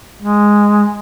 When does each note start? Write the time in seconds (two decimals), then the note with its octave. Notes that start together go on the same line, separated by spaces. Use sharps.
0.22 G#3